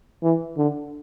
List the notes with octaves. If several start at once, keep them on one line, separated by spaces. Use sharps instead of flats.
E3
D3